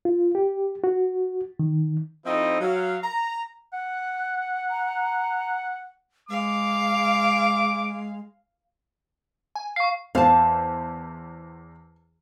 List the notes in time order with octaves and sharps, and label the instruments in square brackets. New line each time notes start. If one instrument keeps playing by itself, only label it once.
[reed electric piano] F4
G4
F#4
D#3
[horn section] F3 C4 D#4 E4 A4 D#5
F#3 F5
A#5
[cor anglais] F#5 [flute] F#6
[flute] A#5
[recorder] G#3 [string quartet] F5 [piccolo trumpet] D6
[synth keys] G#5
[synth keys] F5 [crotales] C#6 C7
[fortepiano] E2 C5 [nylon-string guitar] F5 A5